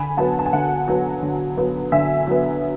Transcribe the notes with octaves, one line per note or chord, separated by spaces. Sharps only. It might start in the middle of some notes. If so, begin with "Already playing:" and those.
Already playing: D3 G#5 B5
F#3 B3 F#5 A5
A5
G#5
D3 F#5
F#3 B3
D3
F#3 B3
D3 E5 G#5
F#3 B3